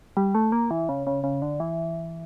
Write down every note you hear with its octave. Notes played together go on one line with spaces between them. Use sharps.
G3
A3
A#3
E3
C#3
C#3
C#3
D3
E3